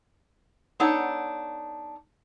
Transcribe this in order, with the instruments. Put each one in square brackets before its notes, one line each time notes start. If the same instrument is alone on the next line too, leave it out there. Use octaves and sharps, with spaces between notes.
[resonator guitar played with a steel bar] B3 D4 D#4 A4 C#5 F#5